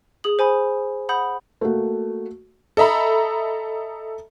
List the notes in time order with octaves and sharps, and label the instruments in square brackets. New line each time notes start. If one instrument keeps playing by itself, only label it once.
[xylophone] G#4 D#6 F#7
C5 G#5 B5 D#6
F#5 B5 D#6 G6
[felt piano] A3 A#3 F#4
[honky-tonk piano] A4 D#5 E5 A#5 B5